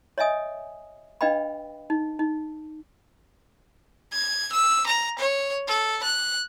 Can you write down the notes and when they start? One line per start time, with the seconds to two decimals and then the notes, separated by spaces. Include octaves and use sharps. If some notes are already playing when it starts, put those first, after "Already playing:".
0.18 C#5 D#5 E5 G#5 D#6
1.21 D4 B4 D#5 F5 G5 B5
1.90 D#4
2.19 D#4
4.12 G#6
4.53 E6
4.87 A#5
5.19 C#5
5.68 A4
6.03 F#6